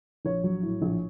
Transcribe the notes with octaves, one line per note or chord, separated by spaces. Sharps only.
A#1 C#5
F#3
A2
A#1